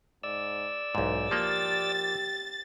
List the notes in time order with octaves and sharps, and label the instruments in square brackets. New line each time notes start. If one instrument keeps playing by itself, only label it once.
[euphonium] G#2 [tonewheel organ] D5 E6
[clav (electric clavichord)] B1 G#2 [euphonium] E3
[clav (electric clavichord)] F3 A#3 [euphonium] G4 [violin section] A6